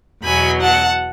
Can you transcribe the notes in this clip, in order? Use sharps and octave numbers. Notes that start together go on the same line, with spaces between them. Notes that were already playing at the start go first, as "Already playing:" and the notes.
E2 B2 F#3 G#5 B5
F#5 A5